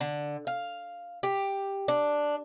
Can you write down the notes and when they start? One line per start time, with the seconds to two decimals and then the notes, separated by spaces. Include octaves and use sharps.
0.01 D3
0.47 F5
1.23 G4
1.88 D4